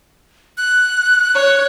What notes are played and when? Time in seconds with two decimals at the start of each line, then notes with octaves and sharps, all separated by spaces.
0.58 F#6
1.35 C#5